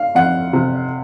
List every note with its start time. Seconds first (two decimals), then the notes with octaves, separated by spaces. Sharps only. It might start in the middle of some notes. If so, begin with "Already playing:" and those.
Already playing: F5
0.15 F2 F#5
0.53 C3